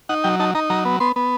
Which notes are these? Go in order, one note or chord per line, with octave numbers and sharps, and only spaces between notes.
D#4 F#5
F#3 G5
D#4 A5
D#4 A#5
F#3 A#5
B3
B3 C6
B3